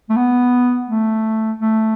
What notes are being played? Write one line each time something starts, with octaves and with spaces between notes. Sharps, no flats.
A3
B3
A3
A3